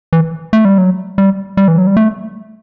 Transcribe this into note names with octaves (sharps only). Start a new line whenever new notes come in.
E3
A3
G3
F#3
G3
G3
E3
F#3
G3
A3